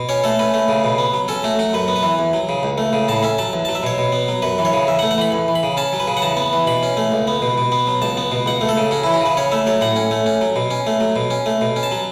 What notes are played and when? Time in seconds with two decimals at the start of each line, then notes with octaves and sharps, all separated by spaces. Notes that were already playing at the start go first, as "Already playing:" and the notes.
Already playing: B2
0.09 C#4 C#5
0.24 A3 A4
0.39 C#4 B4
0.54 A3
0.68 C#3
0.84 B2
0.98 B3
1.13 F#3
1.28 C#4 A4
1.44 A3 F#4
1.59 F#3 F#4
1.73 F#2 B4
1.88 B3
1.96 B4
2.03 E3
2.19 E2
2.33 F#3
2.49 C#3
2.63 C#2
2.78 A3
2.93 C#3
3.08 A2 A5
3.23 C#4 E5
3.38 F#3 A5
3.53 E2
3.65 F#3 A5
3.75 E5
3.83 B2 C#5
3.98 B2
4.12 B3
4.28 F#3
4.42 F#2 B4
4.58 E3
4.65 C#5
4.73 C#3
4.87 E2 E5
4.99 F#5
5.02 A3
5.11 F#5
5.18 E3 B5
5.32 E2
5.48 E3
5.55 B5
5.63 C#3
5.77 C#4 A5
5.93 F#3
6.00 B4
6.08 C#3
6.17 F#5
6.22 E2 A5
6.37 B3
6.53 E3
6.67 B2 B5
6.83 C#4
6.97 A3
7.12 C#2
7.27 B3
7.42 B2
7.58 B2
7.72 B3
7.87 F#3
8.02 C#2 A5
8.17 B3
8.32 B2
8.46 C#2 F#5
8.61 A3
8.69 A4
8.77 C#3
8.91 C#4 F#4
9.04 E3 E4
9.14 F#4
9.21 C#3 B4
9.37 C#4 C#5
9.52 A3 E5
9.66 F#3 C#5
9.81 A2 F#5
9.96 C#4
10.11 A3
10.26 C#4
10.41 F#3
10.56 B2
10.71 C#4
10.87 A3
11.01 F#3
11.16 B2
11.30 C#4
11.46 A3
11.61 B2
11.76 C#4
11.83 A5
11.91 F#3